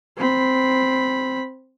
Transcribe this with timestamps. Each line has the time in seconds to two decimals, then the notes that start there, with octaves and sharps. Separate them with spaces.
0.18 C4 B5